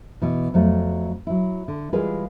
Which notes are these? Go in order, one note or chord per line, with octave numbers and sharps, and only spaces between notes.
B2 E3
F2 F#3 A3
F#3 E4
D3
E3 G3 G#3 F4 G#4 B4